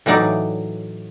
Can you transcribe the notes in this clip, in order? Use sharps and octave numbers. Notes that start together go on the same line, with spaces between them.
A2 E3 F#3 D#4 D5